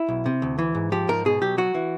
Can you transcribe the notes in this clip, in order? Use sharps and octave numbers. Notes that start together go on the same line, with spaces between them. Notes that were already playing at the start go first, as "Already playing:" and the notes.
Already playing: E4
B1
C3
D2
E3
G#2
F3 G4
G#2 A#4
B2 G#4
F#3 G4
F#3 F#4
E3